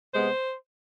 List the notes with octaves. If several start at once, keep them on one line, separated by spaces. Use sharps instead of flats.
C3 G#3 B3 C5